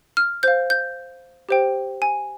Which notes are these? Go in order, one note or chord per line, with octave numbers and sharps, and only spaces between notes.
F6
C5 F5 G6
G6
G4 C5 G5
G#5